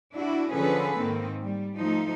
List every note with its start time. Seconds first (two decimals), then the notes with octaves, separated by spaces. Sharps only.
0.15 D4 E4 F#4
0.52 D3 F3 C#4 G#4 A4 B4
1.00 G#2 D#3 A#3 C4
1.43 G3
1.77 F3 A3 D#4